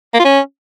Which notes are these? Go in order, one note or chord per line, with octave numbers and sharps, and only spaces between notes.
A#3
F4
C#4